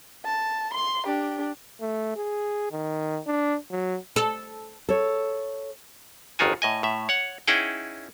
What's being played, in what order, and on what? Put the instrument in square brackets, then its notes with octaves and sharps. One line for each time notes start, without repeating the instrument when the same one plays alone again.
[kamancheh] A5
C6
D4 G4
[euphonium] A3
G#4
D#3
D4
F#3
[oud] A4
[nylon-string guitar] A4 C#5
[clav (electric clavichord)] G1 F2 D#3 F4 F#4 G#5
A2 D#5 G#5
A2 E5
C#5 F#5
C#4 D#4 E4 G#4 F#5 G5